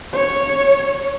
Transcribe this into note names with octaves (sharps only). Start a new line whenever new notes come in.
C#5